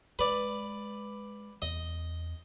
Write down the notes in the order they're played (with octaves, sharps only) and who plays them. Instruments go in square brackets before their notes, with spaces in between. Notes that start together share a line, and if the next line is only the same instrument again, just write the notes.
[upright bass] G#3 [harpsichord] B4 D5
[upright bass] E2 [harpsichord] D#5